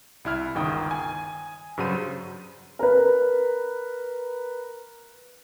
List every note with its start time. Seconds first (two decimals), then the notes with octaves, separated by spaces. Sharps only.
0.25 C2 E4 F6
0.55 G1 C#2 D#3 G5 D#6
0.91 G#5
1.78 G2 C#3 F#3 C5 D#7
2.79 A#4 B4